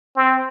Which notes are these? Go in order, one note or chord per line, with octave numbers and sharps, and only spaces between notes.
C4